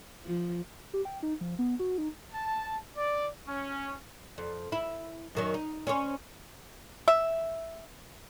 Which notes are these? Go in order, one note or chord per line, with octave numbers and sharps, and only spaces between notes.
F3
G4
G5
D#4
F3
B3
F#4
D#4
A5
D5
C#4
F2
E4
F#2 D#3 F#3
D#4
C#4 C5 C#5
E5